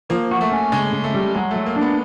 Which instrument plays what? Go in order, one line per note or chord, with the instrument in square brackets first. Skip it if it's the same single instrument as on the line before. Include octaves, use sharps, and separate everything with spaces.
[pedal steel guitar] F3 [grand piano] A#3
[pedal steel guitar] F#4
[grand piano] A3
[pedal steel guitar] C#4
[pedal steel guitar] C#3 [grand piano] G#3
[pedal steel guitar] C#3
[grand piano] A3
[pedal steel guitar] G3
[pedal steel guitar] F#3 [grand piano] G#3
[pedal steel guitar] F#3 [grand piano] A3
[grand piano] A#3
[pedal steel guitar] D4
[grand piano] B3